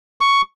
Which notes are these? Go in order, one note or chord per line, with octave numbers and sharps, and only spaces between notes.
C#6